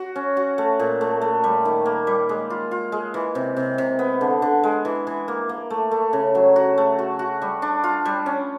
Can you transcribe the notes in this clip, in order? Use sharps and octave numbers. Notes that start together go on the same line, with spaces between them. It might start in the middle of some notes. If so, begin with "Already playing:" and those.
Already playing: F#4
C#4
F#4
A3
A#2
A3
A3
G3
D#3
A#3
G3
G#3
F4
F4
G#3
E3
C3
C3
C3
B3
D3
D3
G#3
E3
E3
A#3
A#3
A3
A3
C#3
F#3
F#4
A3
F#4
F#4
G3
D4
F4
G3
C#4